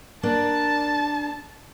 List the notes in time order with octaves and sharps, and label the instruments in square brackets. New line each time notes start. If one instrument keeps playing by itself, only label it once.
[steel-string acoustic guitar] A#3 D4 D5 [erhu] A5